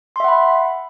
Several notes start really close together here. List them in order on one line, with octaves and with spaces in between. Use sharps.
C6 E5 F#5 B5